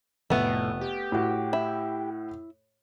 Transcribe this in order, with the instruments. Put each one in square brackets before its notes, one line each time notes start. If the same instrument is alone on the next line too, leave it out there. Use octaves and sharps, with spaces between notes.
[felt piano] F1 [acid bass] A2 [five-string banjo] A3 B3
[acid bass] G4
[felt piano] A2 F#4
[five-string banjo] E4